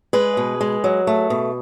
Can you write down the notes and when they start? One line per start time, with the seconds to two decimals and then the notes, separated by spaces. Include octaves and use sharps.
0.13 G#3 G#4 B4
0.37 B2
0.61 G#3
0.84 F#3
1.07 A3
1.30 B2